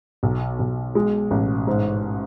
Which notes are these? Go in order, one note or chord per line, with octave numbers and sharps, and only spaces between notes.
B1
B1
G#3
A1
G#2